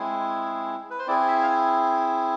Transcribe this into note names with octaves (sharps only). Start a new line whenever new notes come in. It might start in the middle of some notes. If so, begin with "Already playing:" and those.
Already playing: G#3 C4 E4 G#4
B4
C5
C4 E4 G#4 D5
E5
F5
G#5